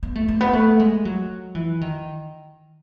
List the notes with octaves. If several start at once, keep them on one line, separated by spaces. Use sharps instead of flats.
B3
A3
A3
B3
A3
G#3
F#3
E3
D#3